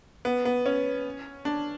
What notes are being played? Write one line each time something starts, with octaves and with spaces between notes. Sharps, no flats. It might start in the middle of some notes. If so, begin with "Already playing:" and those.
B3
B3
C#4
D4